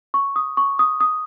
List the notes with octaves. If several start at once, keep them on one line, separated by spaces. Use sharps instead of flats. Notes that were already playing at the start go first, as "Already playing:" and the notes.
C#6
D#6
C#6
D#6
D#6